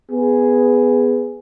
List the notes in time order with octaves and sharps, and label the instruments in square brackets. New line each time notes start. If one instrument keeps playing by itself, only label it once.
[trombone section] B3 G#4